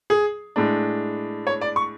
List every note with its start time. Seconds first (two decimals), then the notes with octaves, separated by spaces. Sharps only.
0.10 G#4
0.56 A2 G#3 D4
1.47 C#5
1.61 D5
1.76 C#6